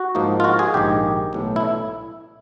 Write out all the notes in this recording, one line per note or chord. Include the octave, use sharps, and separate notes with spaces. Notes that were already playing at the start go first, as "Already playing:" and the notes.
Already playing: F#4
G#2 F3 A#3 D#4
F4
F#4
G#4
A#1 G#2 D#3 G4
B1 A2 E3 A3
E4